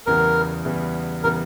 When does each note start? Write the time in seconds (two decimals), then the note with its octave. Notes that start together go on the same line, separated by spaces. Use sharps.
0.06 E2 C#3 E3 G3 B3 A#4
0.65 E2 C#3 E3 G3 B3
1.23 C#3 E3 G3 B3 A#4